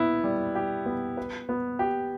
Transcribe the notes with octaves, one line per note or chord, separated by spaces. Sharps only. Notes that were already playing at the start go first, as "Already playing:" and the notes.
Already playing: B3 E4
G3
G4
B3
B4
B3
G4